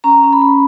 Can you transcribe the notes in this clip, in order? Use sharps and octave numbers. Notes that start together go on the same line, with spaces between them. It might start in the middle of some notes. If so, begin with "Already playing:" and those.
C#4 A#5
C#4
B5
C#4